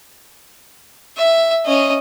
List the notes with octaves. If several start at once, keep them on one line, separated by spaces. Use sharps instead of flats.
E5
C#4 D#5